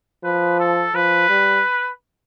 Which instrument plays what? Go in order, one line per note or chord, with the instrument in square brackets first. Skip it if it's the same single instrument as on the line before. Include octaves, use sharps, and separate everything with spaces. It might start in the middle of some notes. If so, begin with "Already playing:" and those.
[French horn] F3 [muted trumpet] B4
[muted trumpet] A4
[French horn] F3 [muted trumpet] B4
[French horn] G3